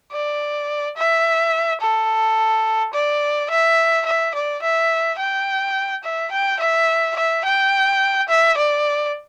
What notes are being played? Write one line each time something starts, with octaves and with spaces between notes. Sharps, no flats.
D5
E5
A4
D5
E5
E5
D5
E5
G5
E5
G5
E5
E5
G5
E5
D5